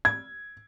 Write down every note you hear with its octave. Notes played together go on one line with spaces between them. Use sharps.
G#6